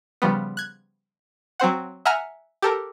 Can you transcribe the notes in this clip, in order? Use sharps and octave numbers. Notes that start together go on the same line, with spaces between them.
C#3 F3 G3 B3
F#6 G#6
F#3 C4 C5 F#5
E5 F#5 G#5 A#5 F6
G4 A4 A#4